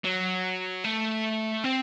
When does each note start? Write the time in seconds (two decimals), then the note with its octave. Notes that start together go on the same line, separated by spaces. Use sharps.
0.04 F#3
0.84 A3
1.64 C4